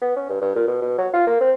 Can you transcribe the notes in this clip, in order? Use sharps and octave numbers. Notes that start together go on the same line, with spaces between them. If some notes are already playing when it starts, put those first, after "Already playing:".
B3
C#4
G2
G2
A#2
B2
B2
F#3
F4
A#3
C4